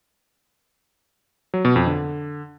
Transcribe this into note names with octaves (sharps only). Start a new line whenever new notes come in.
F#3
B2
F2
D3